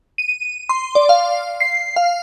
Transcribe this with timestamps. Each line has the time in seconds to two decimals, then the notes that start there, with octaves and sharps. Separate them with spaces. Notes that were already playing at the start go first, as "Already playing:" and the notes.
0.18 D#7
0.69 C6
0.95 D5
1.09 F5
1.60 C7
1.96 F5